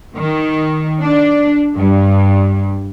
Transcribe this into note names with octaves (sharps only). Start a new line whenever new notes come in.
D#3
D4
G2